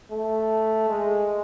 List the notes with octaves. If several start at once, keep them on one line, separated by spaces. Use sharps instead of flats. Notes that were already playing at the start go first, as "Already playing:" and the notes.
A3
G#3